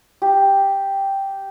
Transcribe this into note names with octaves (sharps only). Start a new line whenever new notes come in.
G4